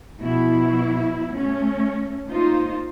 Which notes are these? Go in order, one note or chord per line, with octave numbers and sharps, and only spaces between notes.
B2 F3 E4
A3 C#4
A#3 D#4 F4 C5